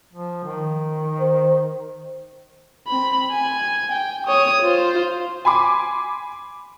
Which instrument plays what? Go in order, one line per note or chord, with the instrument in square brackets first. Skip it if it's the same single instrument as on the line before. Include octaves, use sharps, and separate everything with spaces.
[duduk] F3
D#3
[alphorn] C5
[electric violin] C4 B5
G#5
G5
C#5 D#6
F4 C5
[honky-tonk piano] G#5 B5 C6 D6